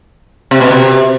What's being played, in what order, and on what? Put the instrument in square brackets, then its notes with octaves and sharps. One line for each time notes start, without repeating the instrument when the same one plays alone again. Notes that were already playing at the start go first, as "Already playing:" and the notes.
[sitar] C3
B2
C3